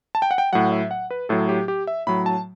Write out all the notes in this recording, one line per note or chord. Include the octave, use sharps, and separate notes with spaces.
A5
G5
F#5
G5
A2 F#3 F#5
E5
F#5
B4
A2 F#3 A4
G4
G4
E5
A2 F#3 B5
A5